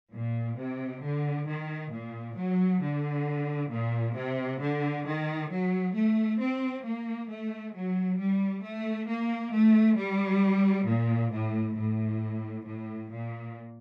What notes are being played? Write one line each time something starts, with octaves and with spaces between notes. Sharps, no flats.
A#2
C3
D3
D#3
A#2
F#3
D3
A#2
C3
D3
D#3
F#3
A3
C4
A#3
A3
F#3
G3
A3
A#3
A3
G3
A#2
A2
A2
A2
A#2